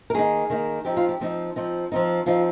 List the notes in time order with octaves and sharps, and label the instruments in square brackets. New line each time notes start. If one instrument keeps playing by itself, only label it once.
[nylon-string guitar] A#4
D#3 A#3 D#4 G#4
D#3 A#3 D#4
F3 C4 D#4 G4
F4
G4
F3 C4 D#4
F3 C4 D#4
F3 C4 D#4
F3 C4 D#4 F4